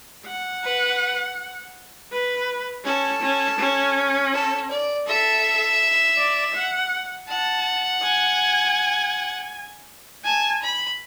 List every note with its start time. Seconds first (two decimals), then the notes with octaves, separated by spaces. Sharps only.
0.26 F#5
0.63 B4
2.12 B4
2.85 C#4 A4
3.22 C#4
3.59 C#4
4.33 A4
4.70 D5
5.07 A4 E5
6.18 D5
6.55 F#5
7.28 F#5 A5
8.03 G#5
10.25 G#5 A5
10.62 B5